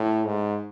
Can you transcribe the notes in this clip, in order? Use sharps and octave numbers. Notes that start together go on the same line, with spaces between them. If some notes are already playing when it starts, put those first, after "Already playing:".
Already playing: A2
G#2